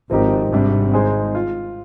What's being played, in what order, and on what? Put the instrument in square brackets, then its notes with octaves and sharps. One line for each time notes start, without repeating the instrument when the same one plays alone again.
[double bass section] G#1 G#2 [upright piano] F3 C4 D#4 G4 A#4
[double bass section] G#1 G#2 [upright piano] C3 G3 D4
[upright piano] G#3 D#4 G#4 C5
F4